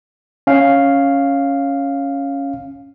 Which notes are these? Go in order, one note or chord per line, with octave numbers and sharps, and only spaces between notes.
C#4 F5